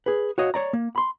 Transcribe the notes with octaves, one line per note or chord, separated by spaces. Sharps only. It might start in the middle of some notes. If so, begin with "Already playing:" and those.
G#4 B4
F#4 C#5 D#5 F5
C#5 D5 A#5
A#3
B5 C6